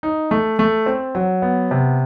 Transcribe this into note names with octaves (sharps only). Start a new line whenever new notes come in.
D#4
A3
A3
C4
F#3
B3
C3